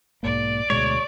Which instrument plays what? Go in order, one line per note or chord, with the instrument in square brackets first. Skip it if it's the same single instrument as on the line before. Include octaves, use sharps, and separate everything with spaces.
[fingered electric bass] B1 G#2 A#3 [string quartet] D5
[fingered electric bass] D2 B2 G#3 [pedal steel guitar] C#5